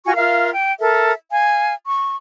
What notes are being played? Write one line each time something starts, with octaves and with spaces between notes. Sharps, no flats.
F4 F#4 G#5 C#6
F4 A#4 E5 F5
G5
A4 A#4 E5
F5 G#5
C#6